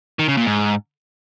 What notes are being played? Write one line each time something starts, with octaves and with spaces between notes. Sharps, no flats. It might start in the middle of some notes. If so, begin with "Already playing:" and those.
D#3
C#3
A#2
G#2